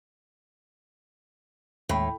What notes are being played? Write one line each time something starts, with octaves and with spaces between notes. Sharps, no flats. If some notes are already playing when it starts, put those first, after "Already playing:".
D#2 A2 G#3 G5 B5